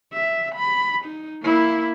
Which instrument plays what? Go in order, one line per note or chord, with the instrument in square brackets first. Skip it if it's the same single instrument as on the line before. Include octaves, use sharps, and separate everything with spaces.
[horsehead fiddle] E5
B5
D#4
A#3 E4